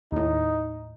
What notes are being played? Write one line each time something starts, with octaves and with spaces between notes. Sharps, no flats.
D#2 A2 D#4